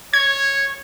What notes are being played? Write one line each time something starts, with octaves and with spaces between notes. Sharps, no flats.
C#5 G#6